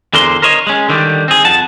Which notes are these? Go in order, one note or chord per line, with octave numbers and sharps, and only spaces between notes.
E2 D3 A#4 C5 C6
A#4 C5 C#5 D#5
G#3 C#4
D3 D#3 G3
C4 G#4
F2 F#5 A5